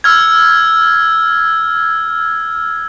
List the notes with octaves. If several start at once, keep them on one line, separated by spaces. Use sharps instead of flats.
E6 F6 G#6